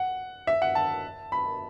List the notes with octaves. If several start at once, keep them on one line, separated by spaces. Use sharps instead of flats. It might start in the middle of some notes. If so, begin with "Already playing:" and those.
Already playing: F#5
E5
F#5
A5
B5